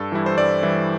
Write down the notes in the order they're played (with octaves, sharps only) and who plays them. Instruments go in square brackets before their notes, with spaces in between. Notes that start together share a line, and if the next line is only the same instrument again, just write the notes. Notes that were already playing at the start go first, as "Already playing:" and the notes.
Already playing: [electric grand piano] G2 A4
E3 G3 E4
C5
G2 D5
E3 G3 E4